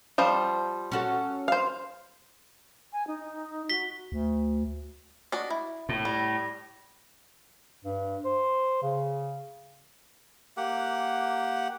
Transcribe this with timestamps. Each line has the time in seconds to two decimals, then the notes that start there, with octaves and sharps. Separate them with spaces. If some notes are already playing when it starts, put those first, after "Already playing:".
0.18 F3 G3 C5
0.92 C#4 F#4 A4
1.48 C5 F5
2.93 G#5
3.07 D#4
3.70 F#4 B6 G7
4.12 D2
5.32 D4 F#4 D#5
5.50 E4
5.89 A2
6.05 G3
7.85 G2
8.25 C5
8.82 C#3
10.57 A#3 G4 F#5